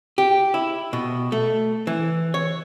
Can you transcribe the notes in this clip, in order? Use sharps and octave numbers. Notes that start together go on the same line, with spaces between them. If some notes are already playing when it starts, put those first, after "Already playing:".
G4
E4
B2
A3
E3
C#5